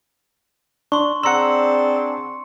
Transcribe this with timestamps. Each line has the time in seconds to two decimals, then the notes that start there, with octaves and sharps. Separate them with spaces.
0.92 D4 C6 C#6
1.23 C4 D4 G#4 F#5 A#5 C6 E6 C#7